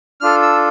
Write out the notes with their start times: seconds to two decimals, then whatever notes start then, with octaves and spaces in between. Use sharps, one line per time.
0.21 D4 F4 A4 F6
0.42 E6